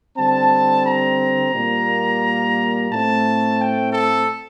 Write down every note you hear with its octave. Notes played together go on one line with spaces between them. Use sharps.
D3 G3 C4 A5
A#5
A#2 G3 A#3
A2 A3 C4 A5
G5
A4